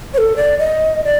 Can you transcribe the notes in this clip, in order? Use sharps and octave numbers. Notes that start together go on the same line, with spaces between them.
C#5
A4
D5
D#5
D5